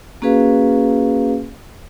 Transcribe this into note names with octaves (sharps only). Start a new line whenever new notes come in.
A#3 C#4 F#4 G#4 B4 F5